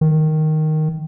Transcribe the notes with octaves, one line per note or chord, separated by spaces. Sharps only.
D#3